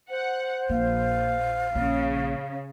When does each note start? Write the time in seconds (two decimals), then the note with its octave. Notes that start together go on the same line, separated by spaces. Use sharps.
0.10 C5 F#5
0.69 A#1 A#3 F5
1.75 A#1 C#3